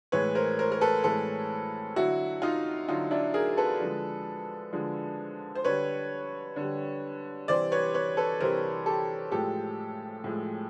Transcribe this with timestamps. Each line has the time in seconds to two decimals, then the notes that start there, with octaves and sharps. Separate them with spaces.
0.12 A2 E3 G#3 B4 C#5
0.35 A#4 C5
0.59 A#4 C5
0.72 A#4
0.81 A4 B4
1.04 A2 E3 G#3 A4 B4
1.96 D3 F#3 E4 F#4
2.42 D#4 F4
2.88 D3 F#3 D#4 F4
3.11 D4 E4
3.34 G#4 A#4
3.57 A4 B4
3.81 D3 F3 G#3
4.73 D3 F3 G#3
5.55 C5
5.64 D3 G3 B4 C#5
6.56 D3 G3
7.48 C3 E3 G3 C5 D5
7.72 B4 C#5
7.94 B4 C#5
8.17 A4 B4
8.40 C3 E3 G3 A#4 C5
8.86 G4 A4
9.32 A2 F3 G#3 G4 A4
10.24 A2 F3 G#3